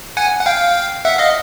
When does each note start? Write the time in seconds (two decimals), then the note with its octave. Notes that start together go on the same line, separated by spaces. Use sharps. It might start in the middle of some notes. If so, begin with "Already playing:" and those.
0.17 F#5 G#5
0.40 F#5
0.46 F5 G5
1.05 E5 F#5
1.18 D#5 F5